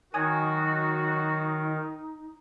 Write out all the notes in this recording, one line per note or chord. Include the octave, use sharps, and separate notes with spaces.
D#3 F#3 D#4 F#4 G#5 D#6 G#6